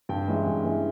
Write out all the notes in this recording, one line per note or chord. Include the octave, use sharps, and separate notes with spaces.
G2 G5
E3 G#3 C#4 E4
G2
E3 G#3 C#4 E4